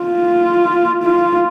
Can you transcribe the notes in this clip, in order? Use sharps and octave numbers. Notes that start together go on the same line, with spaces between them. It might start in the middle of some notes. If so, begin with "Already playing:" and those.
Already playing: F4
F4